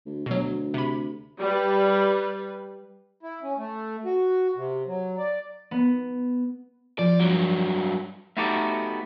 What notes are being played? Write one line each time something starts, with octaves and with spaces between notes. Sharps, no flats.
D2
D2 B2 F#3
C3 B5
G3 B4
E4
C#4
A3
F#4
C3
F#3
D5
B3
F3 D5
G2 F#3
A3 B3 D#4 F#4 G4 A4